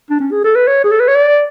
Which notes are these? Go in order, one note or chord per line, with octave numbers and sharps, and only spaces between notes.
D4
C#4
G#4
A4
B4
C#5
G#4
A4
B4
C#5
D5